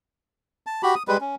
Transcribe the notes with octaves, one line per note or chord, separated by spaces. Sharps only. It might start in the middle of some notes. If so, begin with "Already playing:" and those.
A5
F#4 G4 B5
D#6
G3 G#3 B4
C#4